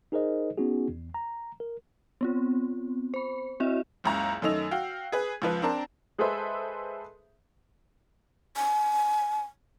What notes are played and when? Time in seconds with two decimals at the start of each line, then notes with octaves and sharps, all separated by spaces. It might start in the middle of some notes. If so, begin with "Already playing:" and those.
0.12 D#4 G#4 A#4 C5 D#5
0.57 B3 C#4 D#4 F#4 G#4
0.89 E2
1.14 A#5
1.60 A#4
2.21 B3 C4 F4
3.14 C5 B5
3.60 C4 E4 F#4 D#5 E5
4.04 F#1 C#2 A#5
4.42 F#2 D#3 A3 D#5 E6 F7
4.71 F#4 F5 G5
5.12 G#4 B4
5.42 C#2 F3 B4
5.62 C4 D4 A#4 A5
6.18 G#3 G#4 A4 B4 C5 E5
8.56 G#5